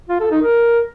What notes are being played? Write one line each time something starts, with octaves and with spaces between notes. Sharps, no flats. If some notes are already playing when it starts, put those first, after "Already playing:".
F4
A4
D#4
A#4